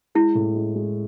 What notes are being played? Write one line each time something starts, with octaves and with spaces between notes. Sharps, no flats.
G#3 E4
A2
G#3
G#3